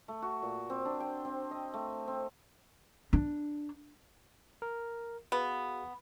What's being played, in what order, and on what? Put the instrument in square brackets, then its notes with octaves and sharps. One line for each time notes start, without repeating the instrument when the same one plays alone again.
[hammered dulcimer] A3
F#4
A#2
C4
D4
G5
C4
D#5
A3
C4
[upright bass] D4
[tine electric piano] A#4
[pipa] B3 [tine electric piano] F#4 G#4 F5